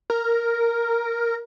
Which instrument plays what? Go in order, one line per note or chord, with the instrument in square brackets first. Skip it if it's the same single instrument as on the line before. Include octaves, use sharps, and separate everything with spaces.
[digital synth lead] A#4